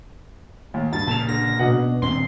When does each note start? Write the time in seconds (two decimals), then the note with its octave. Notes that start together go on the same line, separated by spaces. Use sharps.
0.74 D#2
0.93 G2 A6
1.07 A#2 C#3 A5 E7 F7
1.28 D3 A#6
1.59 B2 D4 D#5 F#5
2.02 D#1 C4 C6